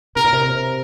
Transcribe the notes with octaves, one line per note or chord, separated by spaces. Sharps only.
C3 A#4
A#2
C3